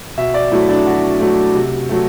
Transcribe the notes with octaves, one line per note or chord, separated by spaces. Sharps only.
B2 E5
D5
F#3 A3 E4
D4
B2 F#4
F#3 A3
C3
F#3 A3